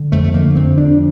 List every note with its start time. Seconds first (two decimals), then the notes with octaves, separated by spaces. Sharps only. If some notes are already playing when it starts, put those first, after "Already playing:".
Already playing: D3
0.12 F2 A3
0.24 A3
0.34 D3 A#3
0.55 F2 C4
0.78 F2 D4